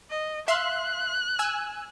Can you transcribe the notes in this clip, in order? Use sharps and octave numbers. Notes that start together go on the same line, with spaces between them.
D#5
E5 F5 C6 F#6
G#5 E6